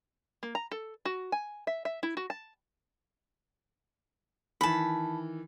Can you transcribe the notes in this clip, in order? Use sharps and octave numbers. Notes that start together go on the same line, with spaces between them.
A#3
A#5
A4
F#4
G#5
E5
E5
E4
F#4
A5
D#3 E3 A5 B5